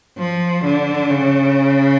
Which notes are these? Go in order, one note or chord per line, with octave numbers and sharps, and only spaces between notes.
F3
D3
C#3